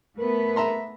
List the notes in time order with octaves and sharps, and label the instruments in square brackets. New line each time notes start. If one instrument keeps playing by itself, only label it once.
[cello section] A3 B3 B4 [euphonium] A#4
[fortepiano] E5 A#5 C6